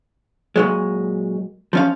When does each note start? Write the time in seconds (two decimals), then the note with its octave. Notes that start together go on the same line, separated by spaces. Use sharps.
0.56 A#2 F#3 G#3
1.73 F3 C#4 F5